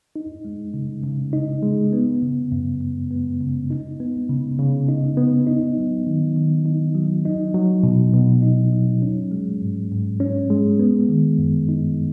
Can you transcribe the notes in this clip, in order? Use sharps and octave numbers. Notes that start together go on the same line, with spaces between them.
D#4
G#3
C#3
C#3
D#4
G#3
B3
C#3
F#2
F#2
B3
C#3
D#4
B3
C#3
C#3
D#4
B3
D#4
F#3
D#3
D#3
D#4
F#3
D#4
F#3
B2
B2
D#4
F#3
C#4
G#3
G#2
G#2
C#4
G#3
B3
D#3
F#2
D#4